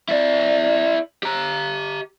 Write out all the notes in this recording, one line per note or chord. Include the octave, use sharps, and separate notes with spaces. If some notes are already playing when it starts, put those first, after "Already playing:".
E4 D5
G4 A#5